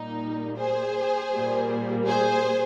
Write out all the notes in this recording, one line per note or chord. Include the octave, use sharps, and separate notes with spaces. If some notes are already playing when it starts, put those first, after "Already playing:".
Already playing: A#2 G3 A#3 D#4
G#4 C5
A#2 G3 A#3
G#4 C5